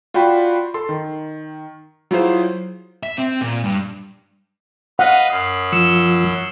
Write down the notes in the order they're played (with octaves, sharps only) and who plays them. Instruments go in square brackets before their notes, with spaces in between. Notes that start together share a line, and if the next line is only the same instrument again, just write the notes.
[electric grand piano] F4 F#4 D5 G5 B5 C6
A4 C6
D#3
F#3 E4 F4 G#4 C5
[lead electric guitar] E5
C4
A#2
G2
[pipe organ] B4 D#5 F5 [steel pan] F#5
[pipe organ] F#2 [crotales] D#6 C7
[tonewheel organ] F3 [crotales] E6 C#7 E7